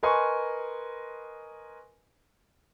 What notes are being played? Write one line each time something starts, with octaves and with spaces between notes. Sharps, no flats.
A#4 B4 D#5 G#5 C6 C#6